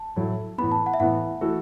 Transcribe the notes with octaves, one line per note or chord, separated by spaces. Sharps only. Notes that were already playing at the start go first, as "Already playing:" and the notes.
Already playing: A5
A2 F#3 A3 E4
A2 E3 B3 B5
A5
F#5
E5
A2 E3 B3 F#5
E3 A3 F#4 A4